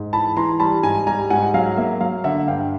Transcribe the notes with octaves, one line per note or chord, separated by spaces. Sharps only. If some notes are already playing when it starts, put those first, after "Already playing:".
Already playing: G#2
E3 A5 B5
E3 A#5 C6
G3 A5 B5
G#2 G#5 A#5
G3 G#5 A#5
G#2 F#5 G#5
F#3 F5
A#3 E5
F#3 F5
D3 E5 F#5
G2 F5 G5